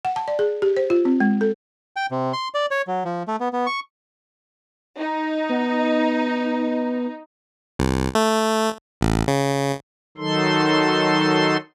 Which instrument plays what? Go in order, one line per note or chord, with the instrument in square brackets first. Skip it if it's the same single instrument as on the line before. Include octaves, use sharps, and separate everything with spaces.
[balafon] F#5
A5
D5
G#4
G4
C5
F4
C4
G#3
A4
[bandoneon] G5
C3
C6
D5
C#5
F#3
F3
A3
B3
B3
C#6
[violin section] D#4
[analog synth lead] B3
[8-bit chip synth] C2
A3
A1
C#3
[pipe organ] D#3 F#3 D#4 A4 C6